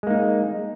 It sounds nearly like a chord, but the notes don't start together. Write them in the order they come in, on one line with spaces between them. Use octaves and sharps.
G#3 A#3 D#4